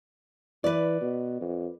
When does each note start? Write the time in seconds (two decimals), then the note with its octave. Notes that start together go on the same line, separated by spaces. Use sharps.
0.64 E3 B4 D5
1.01 B2
1.41 F2